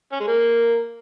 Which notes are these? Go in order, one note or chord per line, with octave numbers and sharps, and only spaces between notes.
C#4
G#3
A#3